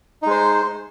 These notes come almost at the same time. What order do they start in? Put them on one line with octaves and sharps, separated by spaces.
D#4 G#3 C5